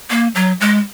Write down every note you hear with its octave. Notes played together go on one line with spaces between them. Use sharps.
A#3
F#3
G#3